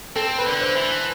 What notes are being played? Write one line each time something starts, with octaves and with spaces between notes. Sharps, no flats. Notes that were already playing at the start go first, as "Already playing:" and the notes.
C4 A4
B4
D3
C5
E3